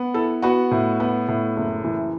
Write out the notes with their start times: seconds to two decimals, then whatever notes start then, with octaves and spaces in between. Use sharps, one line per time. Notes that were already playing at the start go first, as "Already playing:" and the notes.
Already playing: B3
0.14 E4 A4
0.42 B3 F#4
0.71 A2
1.00 B3
1.28 A2
1.56 F#1
1.84 E3